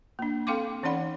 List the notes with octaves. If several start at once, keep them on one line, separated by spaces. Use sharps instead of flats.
A#3 D4
C4 A4 F5 G5 C6 D6
E3 C#4 D#4 D5 F#5 B5